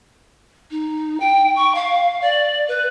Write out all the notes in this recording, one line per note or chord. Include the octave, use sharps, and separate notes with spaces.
D#4
G5
C#6
F5
D5
B4